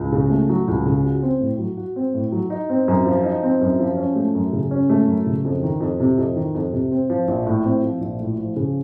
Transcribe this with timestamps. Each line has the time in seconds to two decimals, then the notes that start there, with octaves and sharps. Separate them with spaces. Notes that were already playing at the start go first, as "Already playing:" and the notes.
Already playing: C#2
0.12 C#3
0.30 A3
0.49 F#3
0.68 C#2
0.86 C#3
1.04 F#4
1.23 C4
1.40 A2
1.59 F#3
1.77 F#4
1.96 C4
2.14 A2
2.32 F#3
2.50 D#4
2.70 C4
2.88 F#2
3.06 F3
3.24 D#4
3.43 C4
3.61 F#2
3.80 F3
3.97 C#4
4.15 A3
4.35 F#2
4.53 C#3
4.71 C#4
4.89 A3
5.07 F#2
5.26 C#3
5.45 F2
5.63 D#3
5.80 F2
6.00 C3
6.18 F2
6.36 D#3
6.54 F2
6.72 C3
6.91 C4
7.10 F3
7.28 A#1
7.46 A2
7.65 C4
7.83 F3
8.01 A#1
8.20 A2
8.38 F3
8.56 C#3